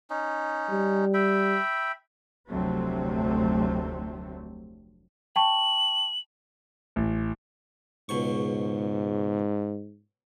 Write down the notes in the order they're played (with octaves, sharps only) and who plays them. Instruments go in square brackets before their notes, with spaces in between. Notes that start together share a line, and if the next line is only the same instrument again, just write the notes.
[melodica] C#4 D#4
[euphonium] G3
[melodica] E5 G5 B5
[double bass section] F1 D2 C3 F#3 A3 C4
[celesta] G5 A5 C#6 [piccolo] F#7
[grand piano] A1
[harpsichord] C#2 B2 C#6 [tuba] G#2